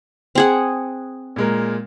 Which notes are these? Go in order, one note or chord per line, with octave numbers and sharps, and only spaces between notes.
C4 G#4 F#5
A#2 G#3 A#4